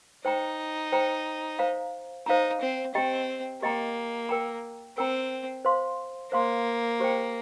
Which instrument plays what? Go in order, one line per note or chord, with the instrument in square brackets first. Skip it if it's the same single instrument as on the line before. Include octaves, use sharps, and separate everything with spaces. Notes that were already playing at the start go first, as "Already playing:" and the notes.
[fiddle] D#4 [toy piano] C5 G5 A#5
[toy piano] C5 G5 A#5
C5 F5 A#5
[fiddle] D#4 [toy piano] C5 F5 A#5
[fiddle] C4
[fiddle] C4 [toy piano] G4 D#5 G5 A#5
[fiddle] A#3 [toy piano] G4 D#5 G5 A#5
[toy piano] A#4 G5 A#5
[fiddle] C4 [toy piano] A#4 G5 A#5
[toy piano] C5 F5 C6
[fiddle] A#3 [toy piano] C5 F5 C6
[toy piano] G4 C5 G5